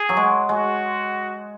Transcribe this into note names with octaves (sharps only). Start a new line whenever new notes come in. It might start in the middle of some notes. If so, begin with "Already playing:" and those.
Already playing: G#4
F#3
G#3
G#3 F#4